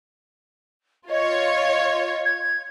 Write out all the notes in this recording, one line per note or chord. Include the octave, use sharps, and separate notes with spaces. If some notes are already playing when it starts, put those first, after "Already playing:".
F4 C#5 D#5
G#6